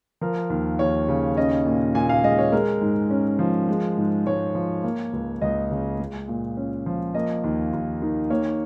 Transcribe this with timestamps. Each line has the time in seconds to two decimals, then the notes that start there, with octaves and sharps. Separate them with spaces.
0.21 F3 A#4
0.50 D#2
0.79 D#2 C#5
1.08 C#3
1.37 C#4 D#5
1.66 A#2
1.95 A#2 G#5
2.09 F5
2.24 G#3 D#5
2.38 C#5
2.52 G#3 A#4
2.81 G#2
3.10 C#4
3.39 F3
3.68 G#3
3.97 G#2
4.27 G#2 C#5
4.55 F3
4.84 A#3
5.13 C#2
5.41 C#2 D#5
5.71 C#3
6.00 G#3
6.28 A#2
6.57 C#4
6.86 F3
7.15 A#3 D#5
7.44 D#2
7.73 D#2
8.02 D#3
8.30 A#3 C#5